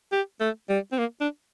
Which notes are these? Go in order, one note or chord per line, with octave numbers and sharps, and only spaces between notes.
G4
A3
G3
C4
A#3
D4